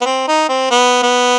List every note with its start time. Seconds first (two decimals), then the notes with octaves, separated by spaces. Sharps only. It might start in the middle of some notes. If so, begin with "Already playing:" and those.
0.02 B3
0.06 C4
0.28 D#4
0.49 C4
0.71 B3
1.03 B3